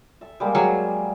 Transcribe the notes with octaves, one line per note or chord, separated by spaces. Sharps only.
A4 E5
G3 G#3 A#3
F#3 G#4